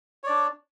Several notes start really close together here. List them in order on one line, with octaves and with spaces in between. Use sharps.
C#5 D5 D4